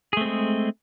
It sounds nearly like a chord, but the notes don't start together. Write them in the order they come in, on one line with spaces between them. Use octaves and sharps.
G#4 A3 C4 G#3